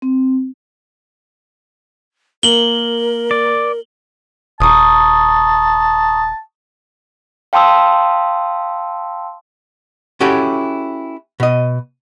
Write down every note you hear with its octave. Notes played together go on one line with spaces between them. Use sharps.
C4
A#3 A#4 F#7 G7
D5
D#1 A5 A#5 C#6 D#6
F5 G5 A5 C6 D#6 E6
C#4 E4 F#4 G4 A4 C#5
B2 D#5